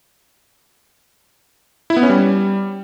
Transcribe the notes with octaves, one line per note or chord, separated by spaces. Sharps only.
E4
B3
C#4
G3